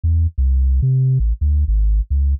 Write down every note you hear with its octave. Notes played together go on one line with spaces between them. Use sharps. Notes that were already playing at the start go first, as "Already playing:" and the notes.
E2
C2
C3
A1
D2
G#1
C#2